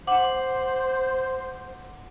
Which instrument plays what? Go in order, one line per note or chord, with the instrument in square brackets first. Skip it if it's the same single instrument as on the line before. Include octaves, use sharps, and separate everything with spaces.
[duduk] C5 [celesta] F#5 D6 F#7